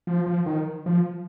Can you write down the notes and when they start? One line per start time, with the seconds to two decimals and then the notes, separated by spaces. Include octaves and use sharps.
0.07 F3
0.27 F3
0.46 D#3
0.86 F3